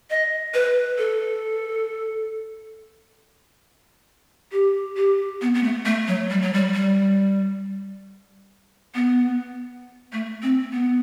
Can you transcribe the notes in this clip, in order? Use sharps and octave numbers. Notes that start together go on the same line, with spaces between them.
D#5
B4
A4
G4
G4
B3
B3
A3
A3
F#3
G3
F#3
G3
G3
B3
A3
C4
B3